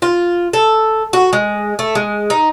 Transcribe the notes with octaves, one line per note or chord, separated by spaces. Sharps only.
F4
A4
F#4
G#3
A3
G#3
D#4